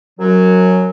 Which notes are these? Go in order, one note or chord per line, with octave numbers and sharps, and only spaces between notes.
F#2 F#3